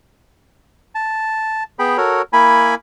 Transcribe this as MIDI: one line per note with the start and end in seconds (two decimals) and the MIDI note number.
0.95 1.63 81
1.79 1.97 59
1.79 1.97 68
1.79 1.97 79
1.79 1.97 83
1.97 2.22 66
1.97 2.22 69
1.97 2.22 70
1.97 2.22 73
2.33 2.75 58
2.33 2.75 64
2.33 2.75 80
2.33 2.75 83